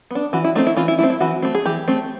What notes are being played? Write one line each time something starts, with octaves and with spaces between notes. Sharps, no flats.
B3 D4
E3 F#4
E4
A3 C4 D#4
E4
E3 F4
E4
A3 C4 E4
E4
E3 F#4
A3 C4
G#4
E3 G4
A3 C4